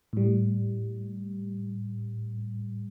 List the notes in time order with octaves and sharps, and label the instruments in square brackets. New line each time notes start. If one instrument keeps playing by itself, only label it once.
[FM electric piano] A2 G3